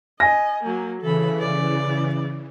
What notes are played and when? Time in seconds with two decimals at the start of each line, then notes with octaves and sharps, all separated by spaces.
0.20 D#5 G#5 A#6
0.64 F#3 A#3
1.02 C#3 E3 A4 B5
1.39 D5